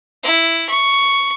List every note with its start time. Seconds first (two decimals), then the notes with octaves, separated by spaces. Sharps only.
0.23 E4
0.69 C#6